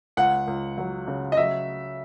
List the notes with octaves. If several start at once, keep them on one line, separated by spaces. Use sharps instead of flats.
C#2 F#5
C#2
F#3
C#3
D#5
F#3 E5